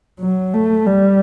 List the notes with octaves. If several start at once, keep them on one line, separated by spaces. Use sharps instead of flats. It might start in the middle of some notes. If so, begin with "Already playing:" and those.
F#3
A3
G3